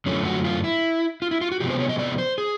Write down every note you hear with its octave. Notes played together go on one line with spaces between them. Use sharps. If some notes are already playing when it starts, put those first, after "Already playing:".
F#2 D3 F3 A3 C#4
F#4
F4
E4
F4
E4
F4
F#4
C3 F3 G#3 B3 G4
C5
C#5
D#5
D5
C5
G#4